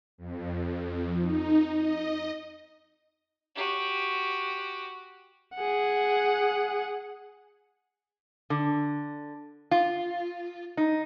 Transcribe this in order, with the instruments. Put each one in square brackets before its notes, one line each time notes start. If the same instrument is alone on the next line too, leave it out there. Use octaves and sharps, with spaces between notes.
[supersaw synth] F2
D#4
D#5
[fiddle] F#4 G4
[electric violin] G#4 F#5
[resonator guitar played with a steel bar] D3
F4
D#4